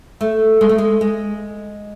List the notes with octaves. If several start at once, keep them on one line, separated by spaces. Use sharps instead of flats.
A3
G#3
A3
G#3
G#3